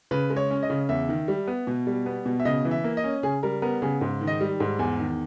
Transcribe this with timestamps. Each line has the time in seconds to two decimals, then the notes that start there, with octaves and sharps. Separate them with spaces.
0.11 C#3 B4
0.30 G#3
0.37 C#5
0.51 C#4
0.63 D#5
0.70 C#3
0.89 E2 E5
1.09 D#3
1.28 G3
1.47 B3
1.67 B2
1.87 G3
2.06 B3
2.26 B2
2.40 E5
2.45 C#3 D#5
2.65 E3
2.71 E5
2.84 A#3
2.97 D#5
3.04 C#4
3.23 C#3 G#4
3.43 G3 A#4
3.62 B3 A#4
3.82 C#3 G#4
4.01 G#2
4.21 D#3
4.27 D#5
4.41 G3
4.60 G#2
4.79 E2 G#5
4.99 D#3